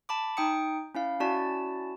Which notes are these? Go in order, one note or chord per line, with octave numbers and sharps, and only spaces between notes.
A5 B5 D6
D#4 G5 D#6 C#7
C#4 E4 F5
C#4 E4 F#4 D5 A5